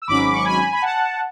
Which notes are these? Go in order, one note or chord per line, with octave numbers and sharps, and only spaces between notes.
E6
G#1 G#2 F#3 C#4 B5 D6
C#6
G#5 B5
B5
F#5 A5